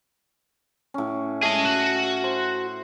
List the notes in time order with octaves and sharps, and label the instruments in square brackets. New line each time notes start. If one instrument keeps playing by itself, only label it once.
[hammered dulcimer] A2 C#4
[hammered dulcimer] C#4 E5 A5 [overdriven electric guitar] G#4 D#5
[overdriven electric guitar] F#4
[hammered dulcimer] C5